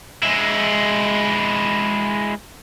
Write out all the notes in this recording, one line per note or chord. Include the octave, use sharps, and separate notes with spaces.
G#3 E4